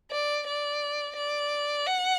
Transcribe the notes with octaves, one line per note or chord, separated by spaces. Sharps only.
D5
D5
D5
F#5